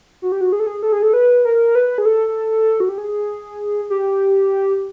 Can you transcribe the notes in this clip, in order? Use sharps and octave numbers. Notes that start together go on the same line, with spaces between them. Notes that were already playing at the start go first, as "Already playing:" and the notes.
F#4
G4
F#4
G#4
A4
G#4
A4
G#4
A4
B4
A#4
B4
G#4
A4
F#4
G4
G#4
G4